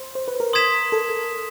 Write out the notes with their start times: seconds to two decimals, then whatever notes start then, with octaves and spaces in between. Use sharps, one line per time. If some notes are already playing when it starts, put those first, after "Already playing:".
Already playing: C5
0.15 C5
0.28 B4
0.40 A#4
0.53 C6 D#6 G#6 B6 E7
0.92 A4